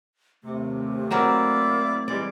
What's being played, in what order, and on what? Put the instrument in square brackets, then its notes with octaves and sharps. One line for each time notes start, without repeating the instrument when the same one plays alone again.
[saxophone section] D#2 C3 [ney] A3
[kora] F#3 C4 A#4 [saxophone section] A#3 E4 D5
[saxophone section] E3 G3 G#3 [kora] D5